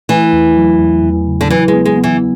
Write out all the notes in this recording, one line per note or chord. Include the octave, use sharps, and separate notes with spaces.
E3 A3
E2
F#3
E2
E2
C#3
D3
E3 F#3
G#3
B3
G#3
B3
E3